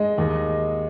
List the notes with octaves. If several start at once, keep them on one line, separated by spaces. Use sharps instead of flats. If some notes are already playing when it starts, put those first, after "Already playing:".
Already playing: G#3 D#5
D#2